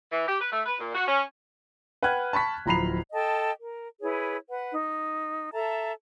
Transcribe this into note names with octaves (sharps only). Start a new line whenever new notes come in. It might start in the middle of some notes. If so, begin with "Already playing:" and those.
E3
G4
B4
A3
B4
A#2
F#4
C#4
B4 F#5 G5 F6 F#6 G#6
A5 B5 C#6 B6
D1 F3 A#5 B5 C7 F7
A4 D#5 G5 A5
A#4
E4 G#4 B4 C#5
B4 F#5
D#4
A4 E5 A5 A#5